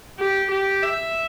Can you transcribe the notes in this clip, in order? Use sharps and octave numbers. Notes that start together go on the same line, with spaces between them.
G4
G4
E5